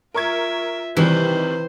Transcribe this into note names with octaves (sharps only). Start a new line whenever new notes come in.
F4 A#4 E5 C#6 G#6
C3 D#3 E3 G3 C5